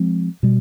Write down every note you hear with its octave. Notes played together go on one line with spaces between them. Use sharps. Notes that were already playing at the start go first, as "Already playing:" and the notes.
Already playing: F3 G#3 C4
B2 G3